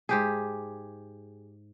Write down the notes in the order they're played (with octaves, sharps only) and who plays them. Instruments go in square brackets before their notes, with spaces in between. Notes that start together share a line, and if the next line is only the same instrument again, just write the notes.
[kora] G#2 G4 G#4